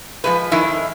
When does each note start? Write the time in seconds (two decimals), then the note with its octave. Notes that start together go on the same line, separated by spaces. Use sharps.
0.24 F3 G#3 B4
0.52 F2 D#3 G#3 E4